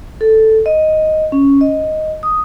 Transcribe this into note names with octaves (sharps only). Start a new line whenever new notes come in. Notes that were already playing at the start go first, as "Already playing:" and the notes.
A4
D#5
C#4
D#5
D#6